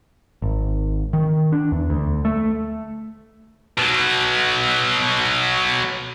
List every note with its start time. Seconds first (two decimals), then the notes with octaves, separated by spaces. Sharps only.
0.42 G#1
1.13 D#3
1.52 D4
1.72 E2
1.90 D2
2.25 A3
3.78 B2 F#3